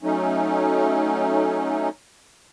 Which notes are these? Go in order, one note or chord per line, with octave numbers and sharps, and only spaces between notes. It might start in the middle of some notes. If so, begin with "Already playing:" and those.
F#3 A3 C#4 D#4